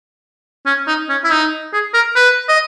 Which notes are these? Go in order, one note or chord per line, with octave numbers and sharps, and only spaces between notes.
C#4
D#4
C#4
E4
D#4
G#4
A#4
B4
D#5